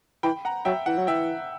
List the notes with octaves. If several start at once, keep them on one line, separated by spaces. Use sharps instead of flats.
E3 G5 B5
F#5 A#5
F#3 E5 G5
E3 F#5
F#3
E3 E5 G5